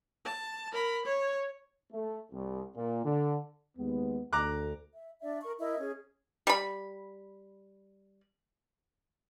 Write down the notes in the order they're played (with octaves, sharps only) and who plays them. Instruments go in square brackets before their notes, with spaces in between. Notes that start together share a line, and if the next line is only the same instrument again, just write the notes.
[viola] A5
A#4 B5
C#5
[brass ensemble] A3
C2
A#2
D3
[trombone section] D#2 G#3 B3
[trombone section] D2 [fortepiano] A#5 D6 F#6
[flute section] E5
D4 D5 E5
A#4 C#6
E4 A#4 D#5 E5
C#4 G#4
[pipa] G3 B5